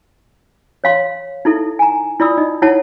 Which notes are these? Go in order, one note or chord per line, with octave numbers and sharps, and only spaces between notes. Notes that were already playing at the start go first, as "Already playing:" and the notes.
C#5 F5 C6
D#4 E4 A4 E5
G#5 A#5
E4 F4 D5 B5 D#6 E6
D#4 D#5
D#4 E4 C#5 F#5 A5